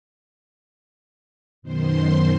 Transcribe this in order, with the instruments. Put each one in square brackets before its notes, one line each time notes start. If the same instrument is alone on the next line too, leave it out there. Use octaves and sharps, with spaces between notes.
[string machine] F#2 B2 D#3 C5 C6